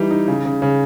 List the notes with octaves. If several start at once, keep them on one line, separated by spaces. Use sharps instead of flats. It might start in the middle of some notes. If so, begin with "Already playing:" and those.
Already playing: E3 G3 D#4
D#4
C#3
C#3
C#3